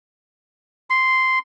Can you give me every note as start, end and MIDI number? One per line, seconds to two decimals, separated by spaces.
0.90 1.39 84